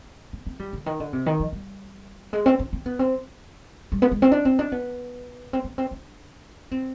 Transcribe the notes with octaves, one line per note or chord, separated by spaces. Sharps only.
C4
C4
G3
D3
D#3
D3
C3
D#3
F3
G3
G#3
C4
D4
C4
B3
C4
G3
B3
G#3
C4
D4
C4
D4
B3
C4
B3
C4
D4
C4